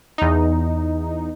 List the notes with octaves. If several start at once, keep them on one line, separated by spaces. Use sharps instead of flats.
E2 D#4